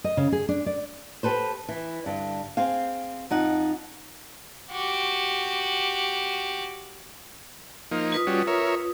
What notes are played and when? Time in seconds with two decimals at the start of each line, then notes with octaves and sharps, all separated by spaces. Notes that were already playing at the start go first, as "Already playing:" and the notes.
0.04 D#5
0.17 C#3
0.32 G#4
0.49 D4
0.66 D5
1.23 G4 A4 B4 C5
1.69 E3
2.06 G2 D3
2.57 C4 G#4 F5
3.30 F2 D#4 F#5
4.71 F#4 G4
7.91 F3 A#3 D#4
8.12 F4 B4 D#6
8.27 G3 C#4 F#4
8.47 A#4 C#5 E5